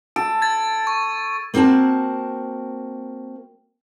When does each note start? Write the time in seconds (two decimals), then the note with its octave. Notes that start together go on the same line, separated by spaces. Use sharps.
0.16 A4 D7
0.42 G#6 A6
0.87 C#6
1.54 A#3 C4 F#4 A#4 A5